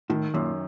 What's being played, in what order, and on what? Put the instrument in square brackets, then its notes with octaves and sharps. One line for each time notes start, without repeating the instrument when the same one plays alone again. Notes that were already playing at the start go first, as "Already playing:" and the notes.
[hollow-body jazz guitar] A2 [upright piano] D#3
[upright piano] F#2 [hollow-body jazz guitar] A#2